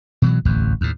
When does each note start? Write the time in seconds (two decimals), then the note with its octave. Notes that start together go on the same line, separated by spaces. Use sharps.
0.22 B2 E3 F#3
0.45 D1 A1 E2
0.81 D#2 A2